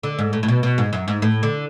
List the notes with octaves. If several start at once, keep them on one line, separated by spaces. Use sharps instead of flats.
D3
G#2
A2
A2
B2
B2
G#2
F#2
G#2
A2
D3